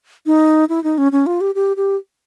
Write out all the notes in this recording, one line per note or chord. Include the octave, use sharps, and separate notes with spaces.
D#4
E4
D#4
C#4
C#4
F4
G4
G4
G4